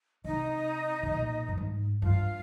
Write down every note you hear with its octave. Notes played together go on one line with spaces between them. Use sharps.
C3 D#4 D#5
C3
A#2
G2
G#2
G2 F4 F5